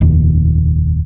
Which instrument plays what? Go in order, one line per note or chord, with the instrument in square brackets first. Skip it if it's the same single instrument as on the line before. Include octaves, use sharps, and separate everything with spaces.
[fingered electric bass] F1 D#2 A#2